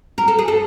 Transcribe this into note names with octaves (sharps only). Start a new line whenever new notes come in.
A#4
A4
G#4
A4